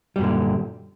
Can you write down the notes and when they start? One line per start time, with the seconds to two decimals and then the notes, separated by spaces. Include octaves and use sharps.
0.16 G3
0.18 F#2
0.21 A#2
0.23 D3